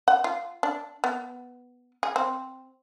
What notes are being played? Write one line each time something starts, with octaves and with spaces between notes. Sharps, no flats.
F#5
F4
D4
B3
G#4
C4